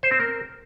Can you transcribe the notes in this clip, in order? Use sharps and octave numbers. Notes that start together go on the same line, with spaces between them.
C5
C4
A#4